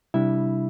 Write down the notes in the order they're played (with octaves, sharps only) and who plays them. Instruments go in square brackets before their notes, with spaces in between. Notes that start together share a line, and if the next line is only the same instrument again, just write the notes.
[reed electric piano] C3 G3 D4 E4 E5